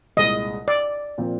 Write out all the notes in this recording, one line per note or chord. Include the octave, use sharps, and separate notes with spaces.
C2 A#2 G#3 D#5
D5
A#2 F3 C4 F4 A#4